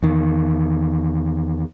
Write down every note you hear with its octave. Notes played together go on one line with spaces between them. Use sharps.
E2 D#3